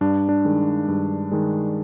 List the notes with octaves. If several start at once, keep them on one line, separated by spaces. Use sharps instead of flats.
G2 D4
D4
D#3 G#3
G2
D#3 G#3